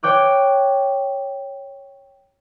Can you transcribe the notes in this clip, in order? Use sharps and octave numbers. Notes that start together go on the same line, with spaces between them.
C#5 G5 D6 F#6